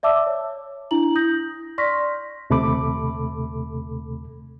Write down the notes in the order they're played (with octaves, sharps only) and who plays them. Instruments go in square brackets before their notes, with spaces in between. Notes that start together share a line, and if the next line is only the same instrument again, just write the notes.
[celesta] D5 E5 A5 D6 E6
C#5
D4 E4 A#5 F#7
D#6 G6 A#6
D5 C6 C#6 F6 A#6 B6
[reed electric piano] D#2 C3 A3 A4 B5 D6